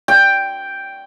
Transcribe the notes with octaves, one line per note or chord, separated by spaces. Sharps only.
G5